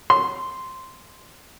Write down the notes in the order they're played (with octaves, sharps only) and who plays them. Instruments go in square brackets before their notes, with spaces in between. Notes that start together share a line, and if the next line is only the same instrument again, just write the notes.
[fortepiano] C6